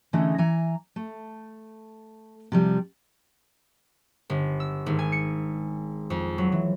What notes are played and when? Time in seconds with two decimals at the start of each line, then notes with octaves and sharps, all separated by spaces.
0.13 D3 E3 A3 C#4 D#4 G#4
0.38 E3 G#5 A#5
0.96 A3
2.52 C3 F3 G3
4.30 G1
4.60 E6
4.86 G#1
4.99 G#5
5.12 C#7
6.10 F2
6.38 F#3
6.52 E3